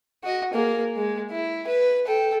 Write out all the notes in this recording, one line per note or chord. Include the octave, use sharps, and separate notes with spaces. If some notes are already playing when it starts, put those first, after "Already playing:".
F#4 D#5
A#3 G#4
G#3
E4
B4
A4 G5